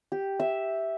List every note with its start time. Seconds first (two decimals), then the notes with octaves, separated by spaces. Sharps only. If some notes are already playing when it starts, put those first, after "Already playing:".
0.12 G4
0.40 E5